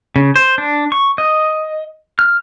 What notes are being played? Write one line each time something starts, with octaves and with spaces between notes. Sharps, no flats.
C#3
C5
D4
C#6
D#5
F6